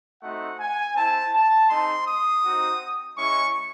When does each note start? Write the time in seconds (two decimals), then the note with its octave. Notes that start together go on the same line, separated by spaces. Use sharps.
0.23 A3 C4 D#4 F#4 F#5
0.59 G#5
0.96 C4 E4 A5
1.33 A5
1.69 G#3 C4 D#4 C6
2.07 D#6
2.43 C4 D#4 F#4
3.17 G#3 C#4 E4 C#6